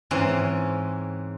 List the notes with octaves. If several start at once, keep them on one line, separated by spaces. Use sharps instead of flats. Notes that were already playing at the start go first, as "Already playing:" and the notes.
G#2 E3 C4 C#4